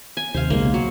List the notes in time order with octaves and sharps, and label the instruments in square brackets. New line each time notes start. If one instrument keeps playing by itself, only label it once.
[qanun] G#5
[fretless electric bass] D#2 C3 [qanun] C5 F5
[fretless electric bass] B1 C#3 G#3 [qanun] A#3
[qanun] F#3